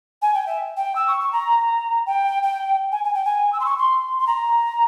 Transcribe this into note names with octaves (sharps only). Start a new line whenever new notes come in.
G#5
G5
E5
G5
E6
C#6
C#6
A#5
G5
G5
G#5
G#5
G5
G#5
E6
C6
C#6
C6
C6
A#5